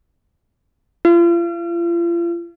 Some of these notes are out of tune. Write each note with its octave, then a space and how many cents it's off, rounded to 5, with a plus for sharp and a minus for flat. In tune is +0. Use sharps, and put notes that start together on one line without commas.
F4 -40